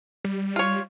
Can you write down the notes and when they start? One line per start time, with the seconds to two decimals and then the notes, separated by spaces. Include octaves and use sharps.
0.24 G3
0.56 F4 C#5